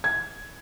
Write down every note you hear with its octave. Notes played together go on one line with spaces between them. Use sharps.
G#6